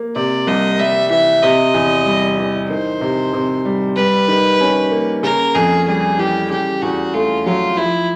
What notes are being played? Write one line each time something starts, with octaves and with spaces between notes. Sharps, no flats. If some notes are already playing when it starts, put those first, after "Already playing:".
Already playing: A#3
C3 D5
C2 D#5
G3 E5
E3 E5
C3 D#5
E2
G3
E3
D#3 C5
C3
C3
G3
G3 B4
D#3
C#4
A#3
C#3 A#4
F2 G#4
G3 G#4
E3 G4
C#3 G4
E2 F#4
A3 F4
F#3 F4
F3 E4